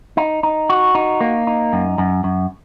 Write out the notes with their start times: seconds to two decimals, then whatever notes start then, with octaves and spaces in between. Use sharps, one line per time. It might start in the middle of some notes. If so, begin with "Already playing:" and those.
0.17 D#4
0.43 D#4
0.70 F#4
0.95 D#4
1.21 A#3
1.47 D#4
1.73 F#2
1.98 F#2
2.24 F#2